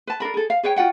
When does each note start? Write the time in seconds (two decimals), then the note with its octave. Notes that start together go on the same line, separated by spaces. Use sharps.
0.07 B4 A5
0.20 D4 A4 A#4 B5
0.34 G#4 A4
0.50 F5
0.63 G#4 B4 C#5 G5
0.76 F4 F#4 F#5 G5